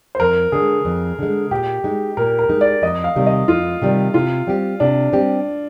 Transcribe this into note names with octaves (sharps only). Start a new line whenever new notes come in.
C5
F2 A#4
D3 G#3 G#4
F2
D3 G#3
A#2 G4
G#3 D#4
A#2 A#4
A#4
G#3 D#4
D5
F2 D#5
F5
C3 D#3 G3
D#5
F2 F4
C3 D#3 G3
C3 F4
G3 C4 G4
C3 D4
G3 C4 G4